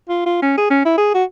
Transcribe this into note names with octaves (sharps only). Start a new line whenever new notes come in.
F4
F4
C#4
G#4
C#4
E4
G#4
F#4